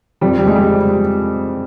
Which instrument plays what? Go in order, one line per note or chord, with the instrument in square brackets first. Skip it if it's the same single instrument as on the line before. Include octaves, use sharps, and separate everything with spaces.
[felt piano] F2 [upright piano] G3
[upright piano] G3
[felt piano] G#3
[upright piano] G3